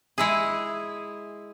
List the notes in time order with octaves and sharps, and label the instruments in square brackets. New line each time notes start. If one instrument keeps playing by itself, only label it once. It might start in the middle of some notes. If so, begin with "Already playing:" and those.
[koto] G#3 E4 G#4